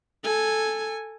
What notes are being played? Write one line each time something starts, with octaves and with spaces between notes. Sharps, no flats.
A4 G#5